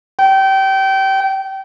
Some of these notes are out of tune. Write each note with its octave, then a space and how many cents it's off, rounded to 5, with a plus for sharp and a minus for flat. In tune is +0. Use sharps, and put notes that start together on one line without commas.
G5 -25